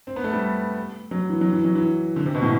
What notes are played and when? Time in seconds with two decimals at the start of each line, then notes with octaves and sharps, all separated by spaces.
0.07 C4
0.16 B3
0.24 A3
0.33 G3
1.11 F#3
1.29 E3
1.41 F#3
1.52 E3
1.65 F#3
1.75 E3
2.16 D3
2.26 C3
2.35 B2
2.42 A2